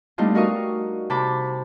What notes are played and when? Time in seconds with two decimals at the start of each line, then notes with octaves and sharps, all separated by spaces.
0.18 G3 A3 B3 D4 D#4 F4
0.35 D#4 F#4 A#4 F5 C#6 D#6
1.10 C3 A5 B5 D6